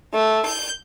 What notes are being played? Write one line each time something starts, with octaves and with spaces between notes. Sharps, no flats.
A3
G6